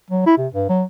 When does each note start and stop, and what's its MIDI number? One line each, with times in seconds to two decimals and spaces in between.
0.10 0.24 54
0.26 0.36 64
0.37 0.47 48
0.54 0.67 43
0.69 0.84 54